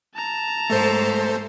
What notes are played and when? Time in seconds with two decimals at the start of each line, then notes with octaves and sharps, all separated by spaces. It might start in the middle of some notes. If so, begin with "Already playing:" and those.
0.15 A5 A#5
0.70 G#2 A3 A4 C5